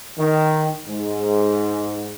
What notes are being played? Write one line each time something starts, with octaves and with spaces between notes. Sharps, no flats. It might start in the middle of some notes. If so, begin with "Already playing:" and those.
D#3
G#2